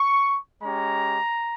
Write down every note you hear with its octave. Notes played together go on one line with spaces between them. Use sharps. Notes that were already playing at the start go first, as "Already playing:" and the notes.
Already playing: C#6
G#3 C#4 G4 A#5